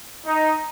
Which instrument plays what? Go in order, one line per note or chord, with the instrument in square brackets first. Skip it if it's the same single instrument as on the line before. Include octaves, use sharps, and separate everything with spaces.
[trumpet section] D#4